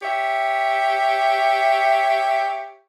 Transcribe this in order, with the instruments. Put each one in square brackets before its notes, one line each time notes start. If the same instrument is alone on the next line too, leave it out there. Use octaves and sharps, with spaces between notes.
[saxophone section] G4 C#5 E5